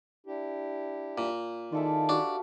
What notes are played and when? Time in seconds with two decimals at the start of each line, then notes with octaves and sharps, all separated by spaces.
0.26 D4 E4 G4
1.18 A#2
1.72 D#3 E4 F4 G#4 A4 D5 E5
2.09 D4 F#4 G4 F5